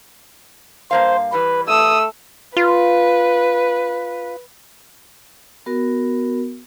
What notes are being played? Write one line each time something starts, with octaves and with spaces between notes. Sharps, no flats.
G2 A#3 C5 F5
E3 G3 B4
A3 D#6 E6
F4 B4
B3 F#4 A#4